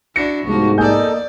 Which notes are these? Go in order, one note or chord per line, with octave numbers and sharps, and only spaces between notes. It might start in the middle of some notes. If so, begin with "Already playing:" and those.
D4 E4 F#4 A#6 C#7
C2 G#2 F3 A#3 B3 F#4
F2 A#3 D#4 A4 D5 D#5 G#5 G6